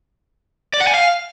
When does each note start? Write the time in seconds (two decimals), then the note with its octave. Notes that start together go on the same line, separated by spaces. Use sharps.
0.74 D5
0.80 F#5
0.87 G#5
0.94 F5